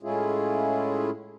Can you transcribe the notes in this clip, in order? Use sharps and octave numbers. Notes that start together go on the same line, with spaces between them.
A2 G#3 C#4 E4 F4 G#4